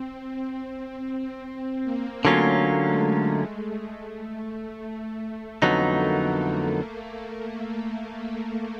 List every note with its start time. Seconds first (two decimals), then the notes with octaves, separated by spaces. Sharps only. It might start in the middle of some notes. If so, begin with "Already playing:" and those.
Already playing: C4
0.56 C4
1.84 A#3
2.25 D3 F#3 A3 A#3 C#4 F4
2.54 A3
2.81 G#3
3.09 A3
3.52 G#3
3.94 A3
4.77 A3
5.20 A3
5.62 F2 D3 F#3 A3 B3 D#4
5.90 A#3